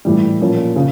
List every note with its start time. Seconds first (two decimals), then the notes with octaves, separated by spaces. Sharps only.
0.05 A2 E3 G3
0.40 A#2 F3 A#3 C#4
0.76 C#3